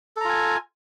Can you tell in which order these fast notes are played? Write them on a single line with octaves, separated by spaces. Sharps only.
A4 A#5 F4 G#5